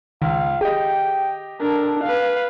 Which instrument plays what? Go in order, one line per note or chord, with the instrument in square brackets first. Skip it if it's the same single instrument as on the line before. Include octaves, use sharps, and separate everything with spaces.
[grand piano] C#2 [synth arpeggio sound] D#3 [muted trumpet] F5
[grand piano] G4 D#5 [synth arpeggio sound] G#4 [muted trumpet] G5
[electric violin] D4 A#4 [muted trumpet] A4
[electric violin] B4 F5